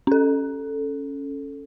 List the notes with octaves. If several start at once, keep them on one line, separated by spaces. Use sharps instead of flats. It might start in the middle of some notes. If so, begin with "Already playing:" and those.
C#4 A4